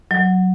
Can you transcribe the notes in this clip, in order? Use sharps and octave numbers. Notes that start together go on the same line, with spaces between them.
F#3